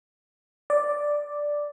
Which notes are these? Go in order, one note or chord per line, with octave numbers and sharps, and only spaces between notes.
D5